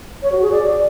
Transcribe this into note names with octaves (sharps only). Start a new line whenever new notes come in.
C#5
F#4
G#4
D5